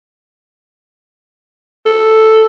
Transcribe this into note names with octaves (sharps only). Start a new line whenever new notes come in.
A4